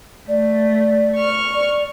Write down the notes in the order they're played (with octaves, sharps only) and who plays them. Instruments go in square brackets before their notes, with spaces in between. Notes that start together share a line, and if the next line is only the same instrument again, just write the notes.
[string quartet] A3 [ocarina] D5
[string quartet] C#6 F6
[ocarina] D5